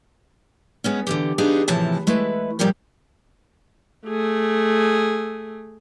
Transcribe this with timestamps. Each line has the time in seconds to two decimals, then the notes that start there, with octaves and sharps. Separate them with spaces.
0.84 G#3 B3 C#4
1.07 D3 E3 G4
1.38 B3 D4 D#4 F4 G4 G#4
1.68 A2 C3 E3 F3 A5
2.07 G#3 A3 E4 B4
2.59 F2 A#2 F3 G3 G4 A#4
4.07 A3 G#4